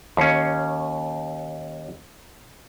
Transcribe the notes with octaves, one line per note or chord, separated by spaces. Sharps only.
D#2 C#4